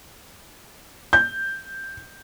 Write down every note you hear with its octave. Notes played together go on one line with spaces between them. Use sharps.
G6